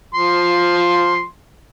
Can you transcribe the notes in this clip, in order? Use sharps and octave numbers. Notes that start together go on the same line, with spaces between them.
F3 C6